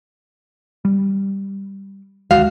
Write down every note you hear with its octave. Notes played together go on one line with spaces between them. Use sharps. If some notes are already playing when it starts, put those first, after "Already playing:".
G3
D2 D#3 G#3 F#4 F5